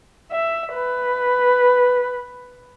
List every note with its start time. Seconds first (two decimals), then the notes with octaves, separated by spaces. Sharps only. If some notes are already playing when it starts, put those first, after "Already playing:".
0.32 E5
0.74 B4